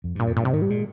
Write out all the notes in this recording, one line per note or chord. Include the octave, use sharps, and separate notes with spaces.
F2
G2
A#2
F2
G2 A#2
C3
G#2 D#3
G3
A#2 G#3